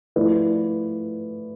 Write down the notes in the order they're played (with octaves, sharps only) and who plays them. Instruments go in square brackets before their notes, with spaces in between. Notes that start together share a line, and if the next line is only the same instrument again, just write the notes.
[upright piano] F3 A3 E4 B4 D5